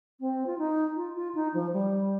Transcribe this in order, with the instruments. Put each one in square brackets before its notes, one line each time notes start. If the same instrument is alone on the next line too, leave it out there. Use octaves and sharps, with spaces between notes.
[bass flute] C4
F4
D#4
F4
F4
D#4
F3
G3